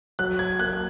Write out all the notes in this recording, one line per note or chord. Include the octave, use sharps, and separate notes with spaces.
F#3 F#6
G#6
A#3 F#6